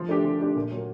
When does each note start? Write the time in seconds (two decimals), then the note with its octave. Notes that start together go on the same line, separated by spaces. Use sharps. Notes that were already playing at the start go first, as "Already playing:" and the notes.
Already playing: F3
0.08 A3 D4 G4
0.24 F3
0.39 A3 D4 G4
0.56 A#2
0.71 F#3 A#3